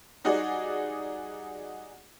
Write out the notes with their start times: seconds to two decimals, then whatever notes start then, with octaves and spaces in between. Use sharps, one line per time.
0.24 G3 D#4 F#4 G#4 D5